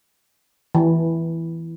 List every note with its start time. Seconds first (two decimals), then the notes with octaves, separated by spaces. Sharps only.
0.75 E3